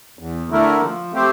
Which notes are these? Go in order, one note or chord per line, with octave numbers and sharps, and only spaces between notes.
E2
D3 A3 E4 A#4
F3
A3 C4 G4 C5